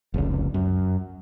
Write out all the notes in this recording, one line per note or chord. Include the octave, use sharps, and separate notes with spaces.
F1 C#2
F#2